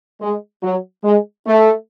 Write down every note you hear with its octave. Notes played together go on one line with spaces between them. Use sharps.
G#3
F#3
G#3
A3